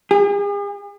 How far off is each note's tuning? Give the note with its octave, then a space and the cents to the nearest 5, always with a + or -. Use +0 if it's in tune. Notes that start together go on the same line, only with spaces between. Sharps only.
G#4 -45